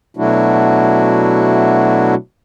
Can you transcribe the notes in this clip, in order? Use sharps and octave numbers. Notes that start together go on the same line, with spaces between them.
B2 F#3 A3 D4 E4 F#4